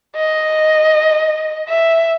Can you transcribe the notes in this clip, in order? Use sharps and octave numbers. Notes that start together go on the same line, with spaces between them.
D#5
E5